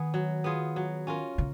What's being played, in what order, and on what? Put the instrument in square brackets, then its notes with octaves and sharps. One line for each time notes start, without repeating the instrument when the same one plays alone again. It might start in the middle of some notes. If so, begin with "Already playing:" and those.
Already playing: [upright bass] D#3 [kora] B3 G#4
[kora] F#3
B3 F4 G#4
F#3
C#4 F4 A#4
[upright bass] C#3